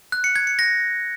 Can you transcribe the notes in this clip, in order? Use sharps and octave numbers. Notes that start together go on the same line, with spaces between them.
F#6
C#7
G#6
C#7
A#6